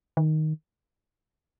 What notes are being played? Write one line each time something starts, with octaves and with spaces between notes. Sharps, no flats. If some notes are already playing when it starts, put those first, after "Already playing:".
D#3